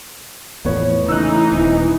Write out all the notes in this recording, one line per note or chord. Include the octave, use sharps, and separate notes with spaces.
E2 A2 F3 B3 C#5
C#3 E3 A3 C#4 D#4 E6 F#6
D#1 C4